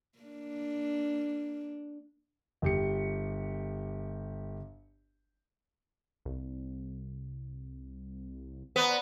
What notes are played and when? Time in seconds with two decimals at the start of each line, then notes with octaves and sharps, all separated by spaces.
0.19 A#3 D4
2.62 G1 G4 C#7
6.25 C2
8.76 B3 C5 D5 A#5